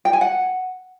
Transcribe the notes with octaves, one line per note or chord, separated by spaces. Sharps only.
G5
G#5
F#5